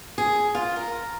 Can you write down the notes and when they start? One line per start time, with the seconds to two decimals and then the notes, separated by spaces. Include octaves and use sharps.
0.18 G#4
0.55 F4
0.76 A#4